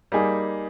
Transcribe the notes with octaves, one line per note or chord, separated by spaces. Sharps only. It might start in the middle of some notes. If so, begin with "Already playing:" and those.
G3 A#3 D#4 G#4